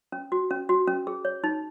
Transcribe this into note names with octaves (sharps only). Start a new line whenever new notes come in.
C#4
F#4
C#4
F#4
C#4
G#4
C#5
D#4